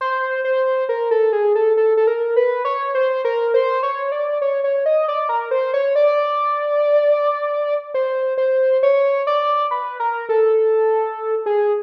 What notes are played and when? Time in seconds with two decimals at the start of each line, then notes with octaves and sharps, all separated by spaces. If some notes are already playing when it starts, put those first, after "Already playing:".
0.01 C5
0.44 C5
0.89 A#4
1.11 A4
1.33 G#4
1.55 A4
1.77 A4
1.97 A4
2.07 A#4
2.36 B4
2.65 C#5
2.95 C5
3.25 A#4
3.54 C5
3.83 C#5
4.12 D5
4.42 C#5
4.64 C#5
4.86 D#5
5.08 D5
5.29 A#4
5.51 C5
5.74 C#5
5.95 D5
7.94 C5
8.38 C5
8.83 C#5
9.27 D5
9.71 B4
10.00 A#4
10.29 A4
11.46 G#4